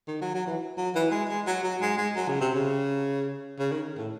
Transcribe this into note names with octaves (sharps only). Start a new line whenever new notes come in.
D#3
F#3
F#3
E3
F#3
E3
G#3
G#3
F#3
F#3
G#3
G#3
F#3
C#3
C3
C#3
C#3
D#3
A2